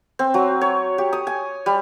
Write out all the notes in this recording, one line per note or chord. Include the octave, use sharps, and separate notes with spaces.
C4
F#3
C#5
G4
D#6
G#5
G3